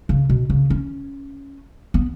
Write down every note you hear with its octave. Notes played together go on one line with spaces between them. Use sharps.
C#3
B2
C#3
C#4
B3